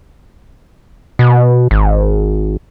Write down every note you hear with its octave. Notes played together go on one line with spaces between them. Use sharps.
B2
G#1